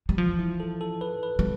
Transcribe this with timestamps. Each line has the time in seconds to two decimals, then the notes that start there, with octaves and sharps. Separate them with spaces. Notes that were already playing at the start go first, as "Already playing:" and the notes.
0.09 G3
0.18 E3 F3
0.39 E4
0.60 A4
0.81 A4
1.01 B4
1.23 B4
1.39 G3